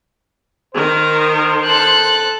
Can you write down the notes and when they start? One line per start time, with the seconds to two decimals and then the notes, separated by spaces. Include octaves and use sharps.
0.75 D#3 A#4 C5
1.66 A4 F#6